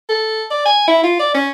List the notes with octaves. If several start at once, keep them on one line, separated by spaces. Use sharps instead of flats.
A4
D5
G#5
E4
F4
D5
C#4